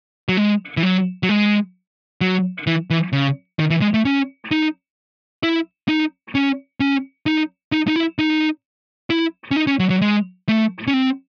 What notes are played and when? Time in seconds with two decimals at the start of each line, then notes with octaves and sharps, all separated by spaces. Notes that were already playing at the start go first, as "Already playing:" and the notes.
0.29 F#3
0.37 G#3
0.77 E3
0.83 F#3
1.23 F#3
1.29 G#3
2.21 F#3
2.67 E3
2.90 E3
3.13 C#3
3.59 D#3
3.70 E3
3.81 G#3
3.94 A3
4.05 C#4
4.51 D#4
5.43 E4
5.88 D#4
6.35 C#4
6.80 C#4
7.26 D#4
7.72 D#4
7.88 D#4
7.96 E4
8.19 D#4
9.10 E4
9.51 C#4
9.56 D#4
9.67 C#4
9.79 F#3
9.90 F#3
10.02 G#3
10.49 A3
10.87 C#4
10.94 C4